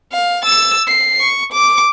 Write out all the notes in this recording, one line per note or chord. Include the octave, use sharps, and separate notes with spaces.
F5
E6 A6
C7
C#6
D6